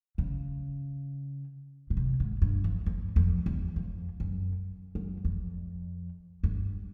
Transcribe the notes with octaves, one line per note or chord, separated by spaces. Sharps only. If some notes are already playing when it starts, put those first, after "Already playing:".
C#3
B2
C3
G#2
G2
F2
F2
F2
E2
F2
F#2
F#2
F2
G2